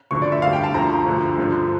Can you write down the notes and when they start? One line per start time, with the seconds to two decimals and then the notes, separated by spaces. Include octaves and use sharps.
0.11 D2 D3 F3 C#6
0.22 D5
0.32 E5
0.42 D2 D3 G3 F5
0.53 G5
0.64 A5
0.74 D2 D3 F3 A#5
1.06 D2 D3 F3
1.38 G2 D3 F3